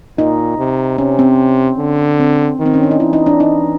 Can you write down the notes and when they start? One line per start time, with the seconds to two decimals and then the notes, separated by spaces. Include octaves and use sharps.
0.18 A#2 D#4
0.58 C3
0.98 C3 C#4
1.19 C4
1.79 D3
2.20 C4
2.59 D#3
2.66 C4
2.74 C#4
2.83 D4
2.91 D#4
3.00 E3 E4
3.13 D#4
3.26 D4
3.40 D#4